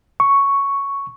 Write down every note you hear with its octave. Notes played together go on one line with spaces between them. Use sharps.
C#6